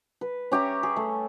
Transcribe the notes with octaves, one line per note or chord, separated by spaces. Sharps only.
B4
C#4 G4 E5 A#5
G#4
A3